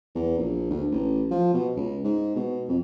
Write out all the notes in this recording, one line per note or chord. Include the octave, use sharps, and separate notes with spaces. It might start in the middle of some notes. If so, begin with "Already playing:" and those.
E2
A#1
D2
A1
F3
B2
C#2
G#2
B2
F2